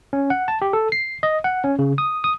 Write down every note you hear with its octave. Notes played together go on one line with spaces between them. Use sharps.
C#4
F#5
A5
G4
A4
C7
D#5
F#5
C#4
C#3
D#6
D#6